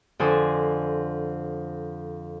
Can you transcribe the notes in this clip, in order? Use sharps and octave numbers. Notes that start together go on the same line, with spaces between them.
F2 D3 A4 C5 G#5 D#6